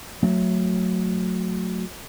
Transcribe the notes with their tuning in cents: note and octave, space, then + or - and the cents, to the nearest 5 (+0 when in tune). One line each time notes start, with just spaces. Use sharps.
F#3 -15 A3 +10